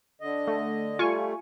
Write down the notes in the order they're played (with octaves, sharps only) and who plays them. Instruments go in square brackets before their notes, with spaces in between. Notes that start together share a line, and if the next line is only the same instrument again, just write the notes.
[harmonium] D3 D#5
[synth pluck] A3
[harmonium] G3 A3 [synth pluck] F4 G#5 C#6